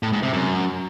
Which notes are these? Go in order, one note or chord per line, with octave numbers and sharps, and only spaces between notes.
A2
G#2
C3
F#2